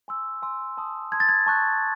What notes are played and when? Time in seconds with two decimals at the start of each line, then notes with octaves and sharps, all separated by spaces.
0.08 G#5 C6 E6
0.42 G#5 C6 E6
0.77 A5 C6 D#6
1.12 A5 C6 D#6 G#6
1.20 A6
1.29 G#6
1.46 A5 C#6 F#6